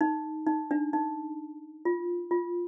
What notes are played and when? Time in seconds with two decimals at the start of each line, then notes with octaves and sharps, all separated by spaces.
0.01 D#4
0.47 D#4
0.71 D4
0.93 D#4
1.85 F4
2.31 F4